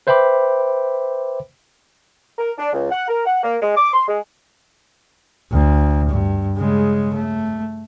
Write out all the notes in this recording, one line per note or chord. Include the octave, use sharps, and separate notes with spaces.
B4 C5 E5 G5 B5 D6
A#4
D4
C#2
F#5
A#4
F#5
A#3
G#3
D6
C6
G#3
D2
G2
C#3 G#3
A3